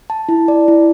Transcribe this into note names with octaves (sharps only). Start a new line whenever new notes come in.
A5
E4
D5
E4